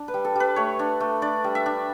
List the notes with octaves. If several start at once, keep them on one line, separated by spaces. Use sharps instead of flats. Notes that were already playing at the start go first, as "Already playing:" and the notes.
Already playing: D4
B4
G3
A4
G3 B4
A3 C#5
D4
A3
D4 D5
G3
E5
D4